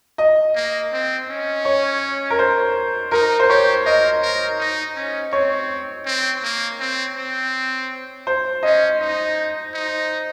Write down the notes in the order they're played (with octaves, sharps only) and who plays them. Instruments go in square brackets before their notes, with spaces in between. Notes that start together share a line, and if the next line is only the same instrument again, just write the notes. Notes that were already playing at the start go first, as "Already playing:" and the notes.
[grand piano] D#5
[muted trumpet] A#3
C4
C#4
[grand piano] C#5
A#4
C5
[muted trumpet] D#4 [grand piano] A#4
[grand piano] C5
[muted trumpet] G4 [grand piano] C#5
[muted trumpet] A#4 [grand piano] D#5
[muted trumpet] A#4
D#4
C#4
[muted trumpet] C4 [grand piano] C#5
[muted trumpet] C4
A#3
C4
C4
[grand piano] C5
[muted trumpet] C#4 [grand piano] D#5
[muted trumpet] D#4
D#4